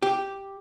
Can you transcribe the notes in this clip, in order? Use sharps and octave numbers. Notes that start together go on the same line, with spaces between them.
G4